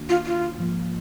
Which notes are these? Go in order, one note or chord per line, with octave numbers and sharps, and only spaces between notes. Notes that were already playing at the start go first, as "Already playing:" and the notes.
Already playing: D#2 D#3 A#3 D4 F#4
F4
F4
G#2 F3 A#3